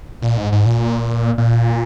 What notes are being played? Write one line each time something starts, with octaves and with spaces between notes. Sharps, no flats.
A#2
G#2
G#2
A#2
A#2